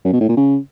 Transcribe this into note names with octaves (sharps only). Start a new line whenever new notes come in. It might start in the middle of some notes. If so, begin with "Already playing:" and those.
F#2
B2
A2
A#2
C#3